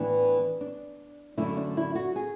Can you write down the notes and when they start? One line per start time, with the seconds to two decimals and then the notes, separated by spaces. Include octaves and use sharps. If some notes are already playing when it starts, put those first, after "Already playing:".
Already playing: A2 E3 B3 D4
0.61 D4
1.37 F#2 D3 A3 E4
1.57 D4
1.77 E4
1.95 F#4
2.16 G#4